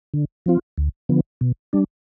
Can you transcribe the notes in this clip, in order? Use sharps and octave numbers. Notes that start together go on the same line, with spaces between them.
D3
F3 C4 F4
D2
D3 F3 B3
B2
G3 D4